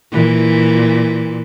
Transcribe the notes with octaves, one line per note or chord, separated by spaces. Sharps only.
A#2 E3